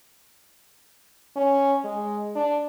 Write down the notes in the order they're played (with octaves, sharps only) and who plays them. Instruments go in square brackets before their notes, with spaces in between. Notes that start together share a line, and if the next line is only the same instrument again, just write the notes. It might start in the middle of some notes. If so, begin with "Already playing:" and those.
[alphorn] C#4
G#3
D4